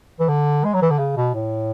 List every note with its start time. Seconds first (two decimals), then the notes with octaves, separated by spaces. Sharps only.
0.20 E3
0.29 D3
0.64 G#3
0.74 F#3
0.82 E3
0.90 D3
0.99 C#3
1.17 B2
1.34 A2